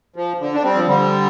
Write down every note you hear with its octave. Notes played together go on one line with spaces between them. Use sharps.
F3
D3
D4
G3 C4
F3
D3 G3